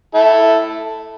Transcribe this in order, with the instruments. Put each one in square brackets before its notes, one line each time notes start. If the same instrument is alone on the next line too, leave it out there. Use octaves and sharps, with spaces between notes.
[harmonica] E4 A4